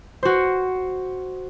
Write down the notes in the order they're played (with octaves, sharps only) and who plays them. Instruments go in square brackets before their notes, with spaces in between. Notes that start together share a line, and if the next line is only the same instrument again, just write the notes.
[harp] F#4 C5